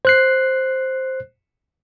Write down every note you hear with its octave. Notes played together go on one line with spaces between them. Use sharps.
C5 F#6 C7